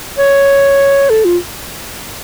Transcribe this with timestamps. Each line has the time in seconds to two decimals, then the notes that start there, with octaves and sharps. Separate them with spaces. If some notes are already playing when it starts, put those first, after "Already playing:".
0.18 C#5
1.10 A4
1.25 F4